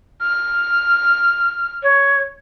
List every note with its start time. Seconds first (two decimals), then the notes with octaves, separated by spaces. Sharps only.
0.22 F6
1.83 C#5